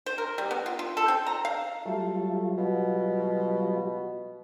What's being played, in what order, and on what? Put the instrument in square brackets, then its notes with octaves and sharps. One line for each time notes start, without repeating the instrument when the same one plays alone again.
[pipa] C5
A#4
G3
B3
F4
F4
A4
C4
A#5
F5
[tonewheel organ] F#3 G3 F4 [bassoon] A3
[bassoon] B2